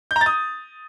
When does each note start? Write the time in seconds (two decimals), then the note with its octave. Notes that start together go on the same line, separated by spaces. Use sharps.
0.11 G6
0.16 A#5
0.21 A6
0.26 D#6